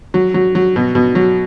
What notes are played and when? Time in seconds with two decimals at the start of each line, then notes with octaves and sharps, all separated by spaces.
0.14 F#3
0.34 F#3
0.55 F#3
0.76 B2
0.95 B2
1.15 F#3